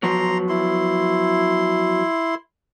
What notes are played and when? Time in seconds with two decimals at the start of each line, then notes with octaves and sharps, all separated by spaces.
0.03 F3 F#3 B3 A#5 C6
0.49 E4 C6